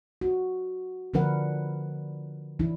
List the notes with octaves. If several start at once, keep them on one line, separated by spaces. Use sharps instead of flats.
F#4
D3 F3 D4 A#4 B4 F#5
E3 D4 E4